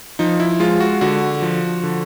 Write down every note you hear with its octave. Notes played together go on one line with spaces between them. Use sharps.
F3 D#4
E4
G#3 F4
F#4
D3 F#4
F3
D3